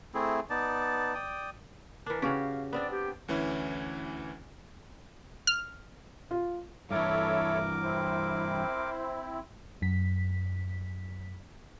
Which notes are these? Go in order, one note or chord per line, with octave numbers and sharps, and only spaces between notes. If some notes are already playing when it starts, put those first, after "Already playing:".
A3 C4 E4 G#4
B3 D#4 D5 A5
D5 G5 D#6
E3 D4 A#4
C#3 C#4 F#4 G4 F5
B3 C4 D4 D5
G4
D2 E3 C#4 E4
F6
F4
G2 E3 E4 A4 A#4 C#5 E5 D6
C4 E4 C5
F#2 B6